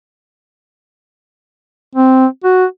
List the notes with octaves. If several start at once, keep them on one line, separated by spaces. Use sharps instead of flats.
C4
F#4